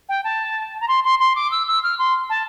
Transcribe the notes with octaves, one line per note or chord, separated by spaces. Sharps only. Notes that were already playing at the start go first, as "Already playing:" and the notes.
G5
A5
A#5
C6
C6
C6
D6
E6
E6
F6
C6
A5